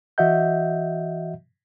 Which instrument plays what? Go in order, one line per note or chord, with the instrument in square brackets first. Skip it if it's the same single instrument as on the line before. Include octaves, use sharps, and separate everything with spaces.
[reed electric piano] E3 F#4 D#5 E5 F#5 G6